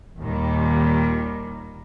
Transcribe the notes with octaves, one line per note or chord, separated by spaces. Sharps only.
D#2 A#2 D#3 G3